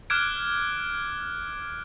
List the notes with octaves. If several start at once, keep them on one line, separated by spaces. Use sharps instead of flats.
D6 F6 F#6 G#6 D7